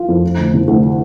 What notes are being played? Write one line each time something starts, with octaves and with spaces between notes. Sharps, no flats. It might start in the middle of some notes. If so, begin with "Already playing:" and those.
Already playing: F4
F2
F3
D2
C3
D2